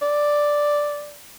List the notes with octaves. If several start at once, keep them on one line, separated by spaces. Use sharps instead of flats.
D5